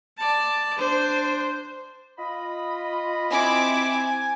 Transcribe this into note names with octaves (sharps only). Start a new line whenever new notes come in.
D5 A5
D4 C5
F4 D#5 B5
C4 E4 G#5 D6